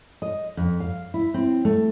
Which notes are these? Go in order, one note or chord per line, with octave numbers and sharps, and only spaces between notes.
D#5
F2
F5
E4
C4
A3